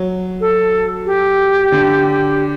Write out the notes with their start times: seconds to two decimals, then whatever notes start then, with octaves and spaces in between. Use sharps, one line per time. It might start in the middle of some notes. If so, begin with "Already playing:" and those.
Already playing: F#3
0.41 A4
1.06 G4
1.72 D3